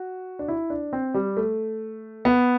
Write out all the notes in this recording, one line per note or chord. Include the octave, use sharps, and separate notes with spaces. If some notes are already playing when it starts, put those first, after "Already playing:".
Already playing: F#4
D4
E4
D4
C4
G3
A3
B3